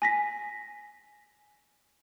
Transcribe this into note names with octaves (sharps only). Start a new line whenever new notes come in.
G#5 A#6 B6